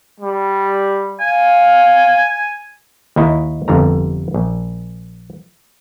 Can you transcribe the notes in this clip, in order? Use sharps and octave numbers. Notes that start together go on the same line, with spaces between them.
G3
F5 G#5
D#2 D#3 D#4 E4 D#5
G1 F2 D3 G3 A#5
A#1